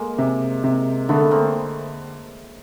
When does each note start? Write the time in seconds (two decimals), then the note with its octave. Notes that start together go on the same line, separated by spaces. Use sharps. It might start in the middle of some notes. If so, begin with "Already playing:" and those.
Already playing: G#3 A#3
0.18 C3
0.64 C3
1.09 D3 A3 B3
1.31 A#3 C4